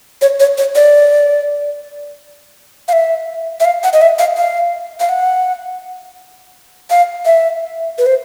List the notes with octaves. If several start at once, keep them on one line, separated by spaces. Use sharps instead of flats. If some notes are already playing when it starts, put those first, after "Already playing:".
C#5
C#5
C#5
D5
F5
E5
E5
F5
F#5
D#5
E5
F5
F5
F5
F#5
F5
E5
B4
C5